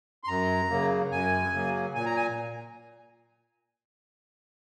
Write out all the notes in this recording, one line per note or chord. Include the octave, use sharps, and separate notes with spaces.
C6
F#2 A#5
C#3 F#3 A#3
F#2 G#5
C#3 F#3 A#3
A#2 G#5
A#5
G#5